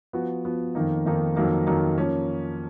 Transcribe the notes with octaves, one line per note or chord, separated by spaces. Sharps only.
F3 B3 F#4
F3 B3 F#4
F2 D#3 A#3 D#4
F2 D#3 A#3 D#4
F2 D#3 F#3 A#3 D#4
F2 D#3 F#3 A#3 D#4
F3 A#3 C#4